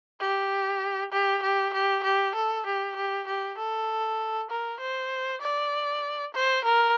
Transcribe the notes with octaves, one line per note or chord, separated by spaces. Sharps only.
G4
G4
G4
G4
G4
A4
G4
G4
G4
A4
A#4
C5
D5
C5
A#4